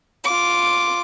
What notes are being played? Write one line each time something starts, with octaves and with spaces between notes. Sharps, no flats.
F4 D6